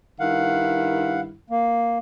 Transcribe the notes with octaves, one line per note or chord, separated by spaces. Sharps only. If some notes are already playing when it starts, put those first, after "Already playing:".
G2 D#3 E4 F5 F#5
A#3